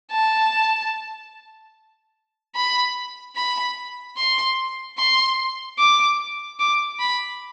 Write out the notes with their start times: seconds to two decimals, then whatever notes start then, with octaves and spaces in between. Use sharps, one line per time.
0.12 A5
2.55 B5
3.36 B5
4.17 C6
4.98 C6
5.79 D6
6.59 D6
7.00 B5